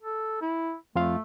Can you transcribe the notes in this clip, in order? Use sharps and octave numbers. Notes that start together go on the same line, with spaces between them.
A4
E4
F2 A3 F4 F5